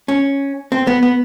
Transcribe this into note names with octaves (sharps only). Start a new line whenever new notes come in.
C#4
C4
B3
B3